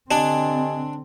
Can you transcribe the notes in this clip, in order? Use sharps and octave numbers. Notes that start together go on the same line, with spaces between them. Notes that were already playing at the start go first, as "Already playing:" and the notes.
D3 C4 D4 G4 D#5 G#5